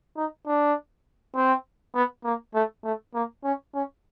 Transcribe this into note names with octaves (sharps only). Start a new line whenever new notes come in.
D#4
D4
C4
B3
A#3
A3
A3
A#3
C#4
C#4